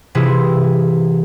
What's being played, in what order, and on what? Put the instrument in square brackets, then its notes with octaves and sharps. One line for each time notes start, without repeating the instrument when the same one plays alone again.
[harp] C3 E3 E4 F4 G#4